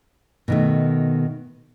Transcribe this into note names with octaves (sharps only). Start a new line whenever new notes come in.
B2 D#3 A3